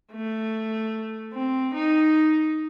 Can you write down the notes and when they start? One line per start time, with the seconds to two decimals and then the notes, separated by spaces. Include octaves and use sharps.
0.12 A3
1.33 C4
1.73 D#4